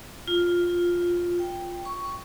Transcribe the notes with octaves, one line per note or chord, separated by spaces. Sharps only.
F4
G5
C#6